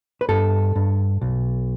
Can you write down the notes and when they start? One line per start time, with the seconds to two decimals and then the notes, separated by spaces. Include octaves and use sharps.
0.21 B4
0.28 G2 A4
0.75 G2
1.21 B1